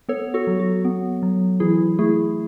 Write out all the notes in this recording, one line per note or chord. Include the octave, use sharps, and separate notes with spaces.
B3 A4 C#5
F#4 A4
F#3
F#4
B3
F#3
E3 E4 G#4
A3 E4 G#4